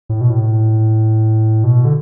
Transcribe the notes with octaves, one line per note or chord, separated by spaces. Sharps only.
A2
B2
A2
B2
D3